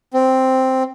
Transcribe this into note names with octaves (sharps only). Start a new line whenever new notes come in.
C4